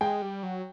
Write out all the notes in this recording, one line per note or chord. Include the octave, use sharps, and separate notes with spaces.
G#3 G5
G3
F#3